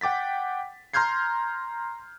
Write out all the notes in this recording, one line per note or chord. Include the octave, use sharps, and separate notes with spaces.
F#5 G5 D6 A6 B6
A#5 C6 F6 G6 G#6 C7